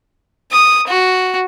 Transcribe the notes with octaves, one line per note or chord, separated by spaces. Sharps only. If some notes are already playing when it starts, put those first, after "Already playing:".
D#6
F#4